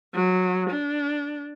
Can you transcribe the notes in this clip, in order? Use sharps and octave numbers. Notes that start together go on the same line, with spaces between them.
F#3
D4